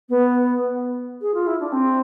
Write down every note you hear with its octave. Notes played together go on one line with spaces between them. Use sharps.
B3
G#4
F4
E4
D4
C4